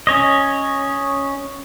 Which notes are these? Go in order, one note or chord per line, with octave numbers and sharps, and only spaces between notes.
C#4 C#5 D#5